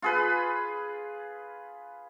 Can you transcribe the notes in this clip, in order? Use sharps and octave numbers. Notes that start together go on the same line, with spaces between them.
F4 G#4 B4